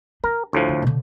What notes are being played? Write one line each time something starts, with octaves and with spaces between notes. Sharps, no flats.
D4 A#4
D2 A2 F3
D3
B2 D3